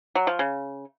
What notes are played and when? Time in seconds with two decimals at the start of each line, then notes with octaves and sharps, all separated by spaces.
0.15 F#3
0.27 F3
0.39 C#3